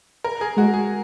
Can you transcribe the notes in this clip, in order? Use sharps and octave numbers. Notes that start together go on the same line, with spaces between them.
A#4
G#4
G#3 F#4
G#4